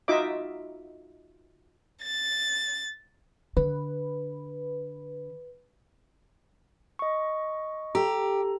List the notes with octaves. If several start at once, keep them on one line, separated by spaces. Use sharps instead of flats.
D#4 F4 F#4 D#5 E5 D6
A6
D3 B4
D#5 C#6
G4 A4 A#5